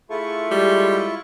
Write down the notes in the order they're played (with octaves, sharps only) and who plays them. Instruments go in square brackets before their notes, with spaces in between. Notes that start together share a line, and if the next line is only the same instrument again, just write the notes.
[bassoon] A3 [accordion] E4 F4 C#6 [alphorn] G#4
[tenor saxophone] G3 [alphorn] G#3